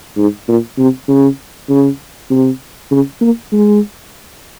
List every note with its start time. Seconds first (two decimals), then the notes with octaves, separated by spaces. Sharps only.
0.18 G#2
0.48 A#2
0.78 C3
1.08 C#3
1.69 C#3
2.30 C3
2.91 C#3
3.21 A#3
3.52 G#3